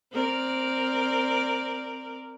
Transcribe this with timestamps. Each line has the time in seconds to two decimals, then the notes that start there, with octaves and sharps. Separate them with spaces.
0.12 C4 A#4 D5